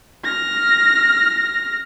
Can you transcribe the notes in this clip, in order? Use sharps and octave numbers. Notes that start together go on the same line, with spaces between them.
F6 A#6